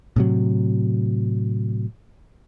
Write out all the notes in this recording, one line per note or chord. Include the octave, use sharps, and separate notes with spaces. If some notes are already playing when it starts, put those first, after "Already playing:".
A2 C3 F#3